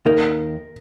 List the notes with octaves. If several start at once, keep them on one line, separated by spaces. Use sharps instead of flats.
D#2 D#3 A#3 D#4 A#4